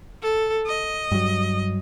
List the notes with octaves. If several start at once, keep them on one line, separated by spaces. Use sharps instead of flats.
A4
D#5
G2 F#3